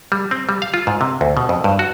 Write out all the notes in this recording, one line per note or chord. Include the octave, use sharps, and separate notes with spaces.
G3
C4
G3
F5
F4
G#2
C3
D2
B2
F2
G2
F#4